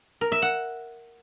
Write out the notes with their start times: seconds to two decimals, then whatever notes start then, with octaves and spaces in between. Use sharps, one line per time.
0.21 A#4
0.32 E5
0.42 F#5